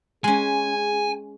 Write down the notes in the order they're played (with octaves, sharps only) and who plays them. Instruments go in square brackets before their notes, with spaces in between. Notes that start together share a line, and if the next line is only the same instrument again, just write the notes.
[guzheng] G#3 C#4 [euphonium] G#4 [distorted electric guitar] G#5